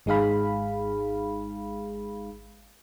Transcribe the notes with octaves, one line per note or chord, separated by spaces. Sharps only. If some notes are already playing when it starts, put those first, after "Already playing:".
G#1 G#3 D#4 G#4 F5 B5